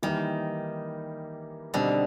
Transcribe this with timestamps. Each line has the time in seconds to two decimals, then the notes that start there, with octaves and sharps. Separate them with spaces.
0.03 D#3 E3 G3 A#3 D#4
1.74 B2 D3 G3 C4 D#4